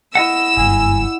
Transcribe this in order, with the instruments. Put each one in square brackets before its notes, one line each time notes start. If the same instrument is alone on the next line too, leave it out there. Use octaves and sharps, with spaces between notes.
[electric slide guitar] E4 D#5 F#5 [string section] E6
[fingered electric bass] F#1 G2 [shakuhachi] G#5